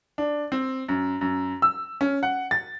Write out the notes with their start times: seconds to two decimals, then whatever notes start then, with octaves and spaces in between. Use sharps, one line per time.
0.18 D4
0.52 C4
0.88 F#2
1.21 F#2
1.62 E6
2.01 C#4
2.23 F#5
2.51 A6